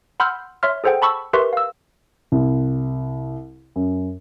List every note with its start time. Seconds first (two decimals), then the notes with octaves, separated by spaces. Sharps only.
0.20 F#5 B5 C6 E6 F6 G6
0.63 C#5 E5 C6 F6
0.84 G#4 A4 C5 F#5 G5
1.02 A5 B5 C#6 E6
1.33 G4 A#4 B4 E5 C6 C#6
1.53 F5 E6
2.32 C2
3.76 F#2